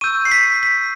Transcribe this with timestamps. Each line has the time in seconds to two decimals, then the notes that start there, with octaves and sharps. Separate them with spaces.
0.01 C#6 E6 G6 D#7
0.25 C7
0.31 B6
0.63 B6